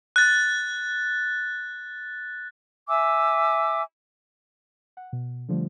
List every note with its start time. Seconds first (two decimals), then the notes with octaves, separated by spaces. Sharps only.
0.16 F#6 A6
2.89 E5 G#5 D6 E6
4.97 F#5
5.13 B2
5.49 D3 F3 G3 A3